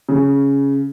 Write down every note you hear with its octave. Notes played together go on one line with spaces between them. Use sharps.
C#3